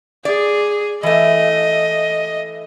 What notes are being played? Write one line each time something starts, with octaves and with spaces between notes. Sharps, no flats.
G#4 D5
E3 A3 D#5